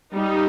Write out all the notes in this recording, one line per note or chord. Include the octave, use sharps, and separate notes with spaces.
G3 D#4